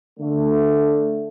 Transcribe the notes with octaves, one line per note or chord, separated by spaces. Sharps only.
D3 A3